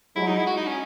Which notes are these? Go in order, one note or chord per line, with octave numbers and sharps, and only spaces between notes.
F#3 G#3 E4
D#4
E4
F#4
D#4
C#4